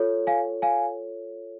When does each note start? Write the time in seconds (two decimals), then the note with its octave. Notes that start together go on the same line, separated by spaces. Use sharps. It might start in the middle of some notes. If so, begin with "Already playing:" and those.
Already playing: F4 A4 C#5
0.27 F5 G#5
0.62 F5 G#5